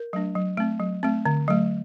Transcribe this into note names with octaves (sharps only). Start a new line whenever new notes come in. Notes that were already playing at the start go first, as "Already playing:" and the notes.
Already playing: A#4
F#3 A3 D4
F#3
A3 C4
F#3
A3 C4
D3
F#3 A3